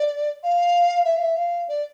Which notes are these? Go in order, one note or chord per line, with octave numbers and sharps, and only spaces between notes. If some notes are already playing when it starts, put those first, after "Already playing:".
Already playing: D5
F5
E5
F5
E5
F5
D5